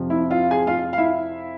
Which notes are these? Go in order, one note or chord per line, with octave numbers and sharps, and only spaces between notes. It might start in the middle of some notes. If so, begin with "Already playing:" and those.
Already playing: F2 C3 F3
E4 E5
F4 F5
G#4 G#5
F4 F5
F5
E4 E5